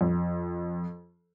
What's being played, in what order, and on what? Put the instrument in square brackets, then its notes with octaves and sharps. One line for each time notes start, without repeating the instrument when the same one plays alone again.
[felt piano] F2